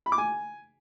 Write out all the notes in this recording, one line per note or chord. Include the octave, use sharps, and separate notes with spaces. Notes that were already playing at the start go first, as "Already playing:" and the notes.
B5
D6
G#5